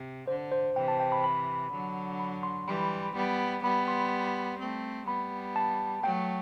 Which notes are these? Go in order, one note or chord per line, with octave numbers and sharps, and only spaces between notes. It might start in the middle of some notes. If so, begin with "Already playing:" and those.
Already playing: C3
D3 C5
C5
C3 E3 G5
A5
G5
B5
B5
D3 F#3
B5
C6
E3 G3 B5
G3 B3
G3 B3 B5
C6
A3 C4
G3 B3 B5
A5
F#3 A3 G5